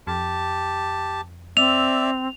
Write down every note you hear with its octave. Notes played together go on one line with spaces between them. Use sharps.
F2 G4 A5
C4 D5 E5 F7